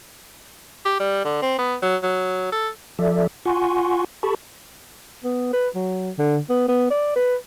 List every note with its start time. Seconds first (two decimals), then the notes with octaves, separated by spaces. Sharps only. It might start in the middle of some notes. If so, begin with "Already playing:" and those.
0.85 G4
1.00 G3
1.25 D3
1.42 C4
1.59 B3
1.82 F#3
2.03 F#3
2.52 A4
2.99 F3 A4 D5 E5
3.46 F4 F#5 G#5 C6 C#6
4.23 G4 A4 A5 B5 C#6
5.24 B3
5.53 B4
5.75 F#3
6.18 D3
6.49 B3
6.68 B3
6.91 D5
7.16 B4